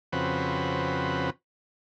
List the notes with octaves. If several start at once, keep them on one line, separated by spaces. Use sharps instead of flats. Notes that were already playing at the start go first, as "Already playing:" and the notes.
F2 C#3 C4 F#4 B4